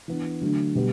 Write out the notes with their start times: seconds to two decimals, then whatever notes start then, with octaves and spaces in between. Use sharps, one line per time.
0.08 E3 B3 D4
0.41 D3 F#3 A3 D4
0.75 B2 G3 B3